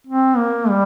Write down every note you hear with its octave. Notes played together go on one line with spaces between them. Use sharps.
C4
A#3
G3